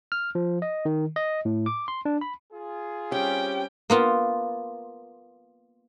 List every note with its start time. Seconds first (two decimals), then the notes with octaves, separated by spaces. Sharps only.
0.12 F6
0.35 F3
0.62 D#5
0.85 D#3
1.16 D#5
1.45 A2
1.66 D6
1.88 C6
2.05 D4
2.21 B5
2.52 F4 G#4
3.12 G3 C4 C#4 G4 G5
3.90 A#3 B3 F4